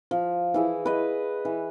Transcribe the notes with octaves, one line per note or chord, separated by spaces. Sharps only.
F3
E3 E4 G#4
B4 D#5
E3